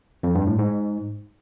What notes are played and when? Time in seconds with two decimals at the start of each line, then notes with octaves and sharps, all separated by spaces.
0.23 F2
0.35 G2
0.47 A2
0.59 G#2